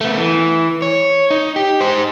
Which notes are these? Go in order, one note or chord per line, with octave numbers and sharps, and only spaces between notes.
A3 B3
E3
C#5
D#4
G4
D#4 C5